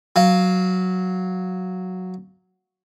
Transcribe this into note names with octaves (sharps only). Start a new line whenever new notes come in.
F#3 F5